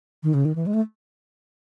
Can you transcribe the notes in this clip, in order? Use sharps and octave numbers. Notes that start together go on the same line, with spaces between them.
D#3
C#3
D#3
E3
G#3
A3